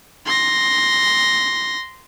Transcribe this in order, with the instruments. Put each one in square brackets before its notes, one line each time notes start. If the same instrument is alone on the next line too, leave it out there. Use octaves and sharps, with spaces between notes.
[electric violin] C6 A#6